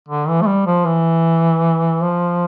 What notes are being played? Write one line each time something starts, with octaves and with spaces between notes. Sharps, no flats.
D3
E3
A3
G3
F3
E3
F3